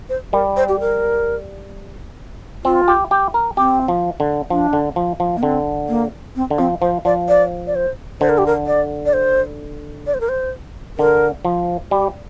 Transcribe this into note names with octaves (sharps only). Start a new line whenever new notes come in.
C5
G3 A#4
C5
G4
A#4
C4 F4
G4
G4
A#4
C4 G4
F3
D3
F3 D4
D3
F3
F3
A#3
D3 C4
A#3
C4
D3
F3 C4
F3 C5
F3 D5
D5
D5
C5
D3 C5
A#4
G4
A#4
D5
D5
C5
D5
C5
A#4
C5
D3 A#4
F3
G3 G4